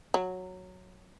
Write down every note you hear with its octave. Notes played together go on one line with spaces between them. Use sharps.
F#3